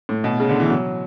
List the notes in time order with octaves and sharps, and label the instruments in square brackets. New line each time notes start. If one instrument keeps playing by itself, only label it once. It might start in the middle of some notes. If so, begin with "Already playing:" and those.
[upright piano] A2
B2
C#3
D3
E3
F#3